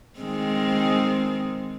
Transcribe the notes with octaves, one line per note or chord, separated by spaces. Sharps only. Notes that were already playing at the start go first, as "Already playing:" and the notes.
D#3 G#3 C4